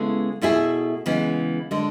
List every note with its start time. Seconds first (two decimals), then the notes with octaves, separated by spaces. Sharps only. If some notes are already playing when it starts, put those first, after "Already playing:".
Already playing: C#3 G#3 B3 E4 A4
0.42 B2 A3 E4 G#4
1.06 C#3 E3 G#3 B3
1.71 D3 G#3